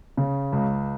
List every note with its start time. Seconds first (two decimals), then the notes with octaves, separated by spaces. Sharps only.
0.17 C#3
0.52 C#2